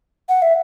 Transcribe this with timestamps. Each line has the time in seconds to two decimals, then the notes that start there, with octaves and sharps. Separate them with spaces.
0.29 F#5
0.42 E5